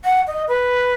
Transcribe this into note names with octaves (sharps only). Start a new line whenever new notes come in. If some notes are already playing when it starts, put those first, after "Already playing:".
F#5
D#5
B4